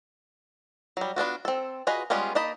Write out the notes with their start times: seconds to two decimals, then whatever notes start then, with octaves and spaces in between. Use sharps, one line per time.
0.97 F#3 G3
1.16 B3 D4 F4 F#4
1.45 C4 A4
1.87 F4 F#4 G#4 B4 D#5
2.10 G3 G#3 B3 C#4 F4
2.35 A#3 D#4 D#5 A5 B5